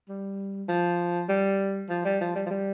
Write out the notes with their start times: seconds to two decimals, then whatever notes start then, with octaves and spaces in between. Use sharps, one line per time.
0.09 G3
0.69 F3
1.29 G3
1.90 F3
2.05 G3
2.21 F3
2.36 G3
2.46 F3
2.51 G3